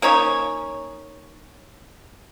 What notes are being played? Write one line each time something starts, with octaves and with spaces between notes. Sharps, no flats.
A#3 C#4 D#4 C#5